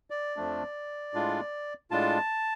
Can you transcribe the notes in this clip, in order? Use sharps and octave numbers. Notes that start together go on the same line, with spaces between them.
D5
F2 F3 A3 D4
A2 G#3 D4 F4
A2 G#3 D4 F4 A5